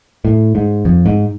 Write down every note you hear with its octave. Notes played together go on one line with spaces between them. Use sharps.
A2
G#2
F2
G#2